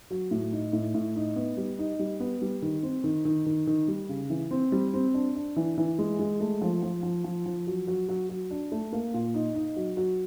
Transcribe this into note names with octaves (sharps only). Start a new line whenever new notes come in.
F#3
A2
D#4
A2
A2
D#4
B3
G3
D#4
G3
B3
G3
D#3
C4
D#3
D#3
D#3
D#3
G3
C#3
E3
C4
G3
C4
D4
D4
E3
E3
G#3
G#3
A3
F3
F3
F3
F3
F3
F#3
F#3
F#3
F#3
D4
A3
A#3
A#2
D#4
D#4
F#3
F#3